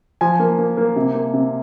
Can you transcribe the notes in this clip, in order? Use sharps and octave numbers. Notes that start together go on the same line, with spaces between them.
F3 G#5
A#3
A#3
A#3
C3
A#3
C3